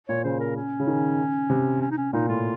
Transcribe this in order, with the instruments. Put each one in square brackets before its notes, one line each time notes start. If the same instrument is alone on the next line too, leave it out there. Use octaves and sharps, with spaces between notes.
[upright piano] A#2 [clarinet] C#5
[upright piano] C#3 [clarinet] C5
[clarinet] A#4
C#4
[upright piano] C#3
D#3
C3
[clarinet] C#4
D#4
C#4
[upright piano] A#2 [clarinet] D#4
[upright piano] A2 [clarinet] F4